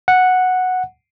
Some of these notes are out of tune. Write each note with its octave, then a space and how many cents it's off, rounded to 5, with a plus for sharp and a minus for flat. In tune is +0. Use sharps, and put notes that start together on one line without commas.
F#5 -5